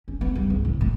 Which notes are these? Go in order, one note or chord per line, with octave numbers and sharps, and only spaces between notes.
C#4
B3
G2
C#2
A2
A3